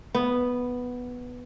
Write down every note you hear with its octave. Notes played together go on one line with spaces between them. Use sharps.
B3